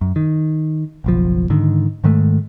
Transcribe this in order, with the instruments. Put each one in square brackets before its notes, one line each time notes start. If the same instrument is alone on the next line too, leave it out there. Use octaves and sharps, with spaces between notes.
[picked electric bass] F#2
D#3
F#1 B1 F3
G#2 D3 D#3
G#2 D#3 G#3 A3